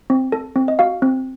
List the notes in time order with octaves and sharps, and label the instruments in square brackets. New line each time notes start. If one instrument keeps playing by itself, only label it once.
[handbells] C4
A4
C4
D#5
F#4 F5
C4